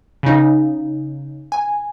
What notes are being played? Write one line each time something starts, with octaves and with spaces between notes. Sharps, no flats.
C#3 D#4
G#5